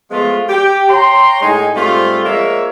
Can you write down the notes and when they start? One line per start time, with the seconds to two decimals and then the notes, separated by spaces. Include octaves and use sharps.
0.11 F3 G#3 A3 B3 F4
0.49 G4
0.88 C#5 G5 A#5 C6
1.42 A2 G#3 D#4 D#5 G#5
1.76 G#2 G3 A3 C4 F4
2.24 F3 G#3 A#3 A#4 C#5 E5